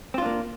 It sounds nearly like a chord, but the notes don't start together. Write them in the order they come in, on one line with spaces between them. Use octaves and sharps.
C4 F4 D4 A#3